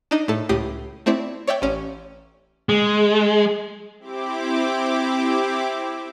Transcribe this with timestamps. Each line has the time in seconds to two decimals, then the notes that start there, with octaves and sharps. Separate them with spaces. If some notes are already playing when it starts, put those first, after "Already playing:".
0.11 D4 D#4
0.28 A2 A4
0.49 C#2 A2 G4 D#6 C7
1.06 A3 C4 E4 D5
1.47 C#5 D5 E5 G5
1.62 A1 C#4
2.69 G#3
3.99 C4 E4 G4 D6